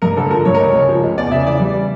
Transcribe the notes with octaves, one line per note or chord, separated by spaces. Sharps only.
G2 A#4
D3 A4
F3 A#4
G2 C#5
A#4
C#2 C#5
C#3
F3
C#2
E2 D5
C#3 E5
E3 D5
G3